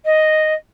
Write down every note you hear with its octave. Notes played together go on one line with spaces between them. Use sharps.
D#5